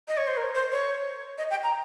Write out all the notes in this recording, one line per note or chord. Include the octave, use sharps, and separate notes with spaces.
D#5
C#5
C5
A#4
C5
C#5
D#5
G5
A#5